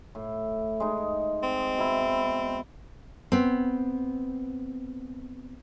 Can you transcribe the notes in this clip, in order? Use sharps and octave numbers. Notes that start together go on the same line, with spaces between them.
A2
G#3 D#4
C4
B2 E4
B3 C4